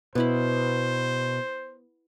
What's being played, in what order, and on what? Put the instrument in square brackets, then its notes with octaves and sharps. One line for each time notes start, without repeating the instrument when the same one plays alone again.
[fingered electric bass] B2 [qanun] B3 E4 B5 [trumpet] C5